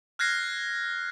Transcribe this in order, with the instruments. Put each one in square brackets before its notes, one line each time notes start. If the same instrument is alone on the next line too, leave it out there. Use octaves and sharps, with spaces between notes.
[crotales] F6 F#6 G#6 A#6 C7